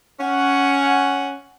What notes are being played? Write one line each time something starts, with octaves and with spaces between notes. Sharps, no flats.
C#4 F#5